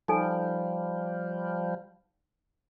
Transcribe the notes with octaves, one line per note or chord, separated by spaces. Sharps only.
F3 G3 D#4 A4 G#5